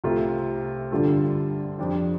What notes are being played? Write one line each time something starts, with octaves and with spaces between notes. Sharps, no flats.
C2 C3 A3 F4
G2 D3 G3 F4 A4
F2 F3 D4 G4